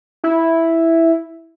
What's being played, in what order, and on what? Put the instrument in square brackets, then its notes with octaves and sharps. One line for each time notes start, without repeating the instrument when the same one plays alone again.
[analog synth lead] E4